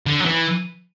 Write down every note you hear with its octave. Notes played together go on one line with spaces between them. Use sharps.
D3
F#3
E3